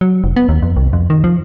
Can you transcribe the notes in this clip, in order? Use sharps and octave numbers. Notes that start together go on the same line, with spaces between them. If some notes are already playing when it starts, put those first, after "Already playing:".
F#3
F1
B3
D#2
F2
C2
F2
D#3
F3